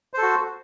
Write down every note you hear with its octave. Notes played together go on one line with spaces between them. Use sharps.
F#4 A4 C5